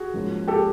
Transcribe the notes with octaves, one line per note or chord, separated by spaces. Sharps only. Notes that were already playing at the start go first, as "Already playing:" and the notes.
Already playing: F#4 G#4
G#2 F3 A#3 C#4
G4 A4